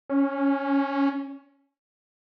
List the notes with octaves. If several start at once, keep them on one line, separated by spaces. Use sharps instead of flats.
C#4